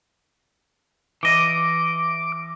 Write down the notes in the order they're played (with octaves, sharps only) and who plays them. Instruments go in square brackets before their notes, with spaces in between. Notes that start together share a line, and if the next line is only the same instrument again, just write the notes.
[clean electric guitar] E3 D#5 [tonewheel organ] D6